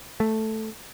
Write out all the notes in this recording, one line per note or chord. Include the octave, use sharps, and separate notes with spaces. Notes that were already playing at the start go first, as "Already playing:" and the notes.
A3